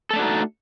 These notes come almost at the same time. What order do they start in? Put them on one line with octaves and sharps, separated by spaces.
A4 A3 D4 F#4 D#4